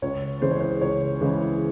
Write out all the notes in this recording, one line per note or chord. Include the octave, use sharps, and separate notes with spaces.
C#2 C#5
C#3 E3 G#3 C5
C#5
C5
C#2 C#5
C#3 E3 G#3